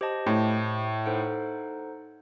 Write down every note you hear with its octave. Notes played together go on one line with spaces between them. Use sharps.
G4 C5 D#5 A5
A2
D#4 A4 C5 F#5